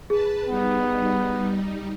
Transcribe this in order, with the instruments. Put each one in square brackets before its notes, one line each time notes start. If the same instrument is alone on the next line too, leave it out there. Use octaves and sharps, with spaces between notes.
[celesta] G#4 [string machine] B4 A5
[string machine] G3 D#4 [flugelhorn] B3